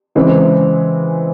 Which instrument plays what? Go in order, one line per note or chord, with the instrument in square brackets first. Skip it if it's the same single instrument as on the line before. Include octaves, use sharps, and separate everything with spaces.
[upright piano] C#3 E3 G#3 C4